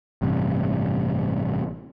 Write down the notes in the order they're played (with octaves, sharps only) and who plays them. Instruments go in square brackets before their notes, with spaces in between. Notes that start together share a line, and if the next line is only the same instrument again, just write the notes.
[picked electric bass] A1 G2 C3